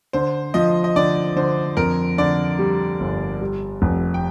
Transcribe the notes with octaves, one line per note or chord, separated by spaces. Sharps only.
D3 C5
F3 D#5
D#5
D3 D5
D3 C5
F2 A#4
D3 D5
G3
G1
G3
F1
G5